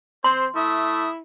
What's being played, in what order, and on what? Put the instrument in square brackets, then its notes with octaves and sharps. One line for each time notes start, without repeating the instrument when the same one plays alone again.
[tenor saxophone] C4 [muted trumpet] C5 [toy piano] C6
[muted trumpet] A3 [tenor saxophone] E4 [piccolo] D#6